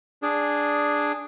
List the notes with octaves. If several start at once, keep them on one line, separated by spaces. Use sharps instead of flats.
D4 G#4